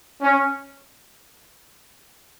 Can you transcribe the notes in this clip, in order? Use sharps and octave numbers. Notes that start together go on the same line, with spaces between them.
C#4